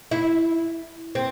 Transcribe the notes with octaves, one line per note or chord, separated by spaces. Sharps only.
E4
C4